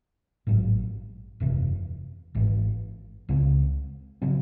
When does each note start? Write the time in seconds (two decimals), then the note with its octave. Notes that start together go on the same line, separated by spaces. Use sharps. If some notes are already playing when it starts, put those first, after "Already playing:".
0.47 A1 G#2 F#3
1.40 F#1 E2 C3 E3
2.35 G#1 G#2 E3
3.29 C#2 C#3 G#3 C4
4.22 C#3 F#3 C4